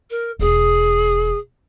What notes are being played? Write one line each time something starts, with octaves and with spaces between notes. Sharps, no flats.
A#4
E1 D#4 G#4